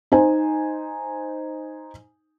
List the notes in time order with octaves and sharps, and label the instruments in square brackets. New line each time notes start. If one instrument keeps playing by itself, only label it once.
[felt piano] D#4 C5 G#5